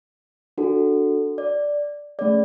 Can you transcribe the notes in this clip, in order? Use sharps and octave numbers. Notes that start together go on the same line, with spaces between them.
D4 F#4 A4
D5
A3 C#4 G#4 D5